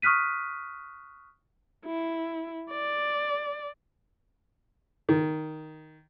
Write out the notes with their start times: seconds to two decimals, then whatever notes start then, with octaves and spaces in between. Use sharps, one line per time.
0.02 C#6 D#6 F6 F#6 B6 D#7
1.85 E4
2.70 D5
5.09 D#3